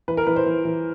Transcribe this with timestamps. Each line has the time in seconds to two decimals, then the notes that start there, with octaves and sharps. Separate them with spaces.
0.08 E3 B4
0.17 A#4
0.27 E3 B4
0.36 C5
0.46 E3
0.65 E3